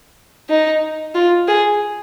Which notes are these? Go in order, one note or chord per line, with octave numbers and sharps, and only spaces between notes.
D#4
F4
G#4